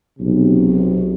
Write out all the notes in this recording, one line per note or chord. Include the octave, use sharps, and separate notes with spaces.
B1 C3